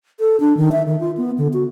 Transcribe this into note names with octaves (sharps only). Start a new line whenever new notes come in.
A4
D4
D#3
E5
D#3
F4
B3
D3
F#4